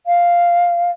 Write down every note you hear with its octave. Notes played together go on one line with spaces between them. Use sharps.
F5